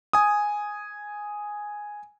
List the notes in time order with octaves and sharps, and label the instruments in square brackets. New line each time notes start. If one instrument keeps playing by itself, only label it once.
[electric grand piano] G#5 D#6